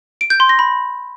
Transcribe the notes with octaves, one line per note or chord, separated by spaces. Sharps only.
D7
G6
C6
A#6
B5